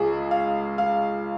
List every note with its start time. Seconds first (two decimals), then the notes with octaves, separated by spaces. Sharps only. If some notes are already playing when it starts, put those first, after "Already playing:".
Already playing: C#2 G#3 G#4
0.31 F5
0.78 F5